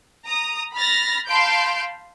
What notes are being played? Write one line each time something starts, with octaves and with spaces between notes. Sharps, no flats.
A#5 D#6
B5 F6 A6 A#6
F5 A5 B5 C6 G6 D7